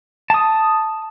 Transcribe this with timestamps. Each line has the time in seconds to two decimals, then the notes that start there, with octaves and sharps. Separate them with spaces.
0.30 A5 D#6